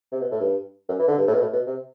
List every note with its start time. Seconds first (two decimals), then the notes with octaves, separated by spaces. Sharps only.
0.12 C3
0.21 B2
0.31 A2
0.40 G2
0.88 F#2
0.99 E3
1.08 D3
1.17 G2
1.27 A2
1.34 B2
1.41 A2
1.53 B2
1.67 C3